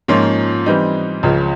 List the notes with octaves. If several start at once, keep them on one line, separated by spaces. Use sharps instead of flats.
G#2 F3 A#3 C#4 F4
E3 G3 C4 D#4
C#2 C#3 F3